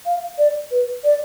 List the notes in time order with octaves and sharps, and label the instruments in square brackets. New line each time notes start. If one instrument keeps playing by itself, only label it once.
[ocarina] F5
D5
B4
D5